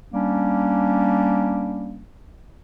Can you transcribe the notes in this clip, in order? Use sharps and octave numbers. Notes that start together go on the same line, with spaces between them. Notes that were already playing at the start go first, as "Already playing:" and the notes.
G3 A#3 C#4 D4